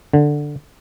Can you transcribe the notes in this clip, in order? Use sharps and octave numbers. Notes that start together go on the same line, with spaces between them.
D3